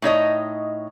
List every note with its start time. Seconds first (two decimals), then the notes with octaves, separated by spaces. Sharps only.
0.02 A2 D#4 C#5 D#5